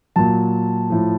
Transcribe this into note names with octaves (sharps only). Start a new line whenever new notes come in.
A#2 F#3 A5
A2 F3